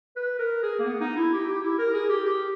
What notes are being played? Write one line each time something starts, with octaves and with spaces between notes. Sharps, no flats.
B4
A#4
G#4
A#3
B3
D#4
E4
G4
G4
E4
A#4
G#4
G4
G4